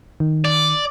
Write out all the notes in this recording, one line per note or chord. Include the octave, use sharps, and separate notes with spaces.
D#3
D5